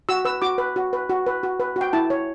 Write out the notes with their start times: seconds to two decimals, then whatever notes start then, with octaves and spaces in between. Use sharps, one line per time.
0.09 F#4 E6
0.25 B4 E6
0.42 F#4 D6
0.58 B4
0.76 F#4
0.93 B4
1.10 F#4
1.26 B4
1.43 F#4
1.60 B4
1.76 F#4
1.81 G5
1.93 E4 A5
2.10 C#5